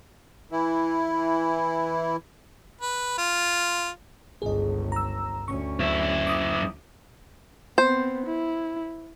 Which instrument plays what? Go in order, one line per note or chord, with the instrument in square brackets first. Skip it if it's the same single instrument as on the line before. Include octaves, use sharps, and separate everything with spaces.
[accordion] E3 E4
[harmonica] B4
F4
[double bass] G1 C#2 [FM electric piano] G#4 D#5
[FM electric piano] A#5 E6
[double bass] D2 C#4 [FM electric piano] C#6
[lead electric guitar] F#2 E4
[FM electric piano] D6 D#6
[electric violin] B3 C4 [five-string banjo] C5
[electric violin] E4